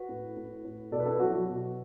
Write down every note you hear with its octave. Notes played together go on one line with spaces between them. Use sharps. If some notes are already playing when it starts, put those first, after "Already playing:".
Already playing: F#4 B4
A2
A2
A2
B2 A4 D5
B4
E4 A4
F#3 F#4
F#4
B2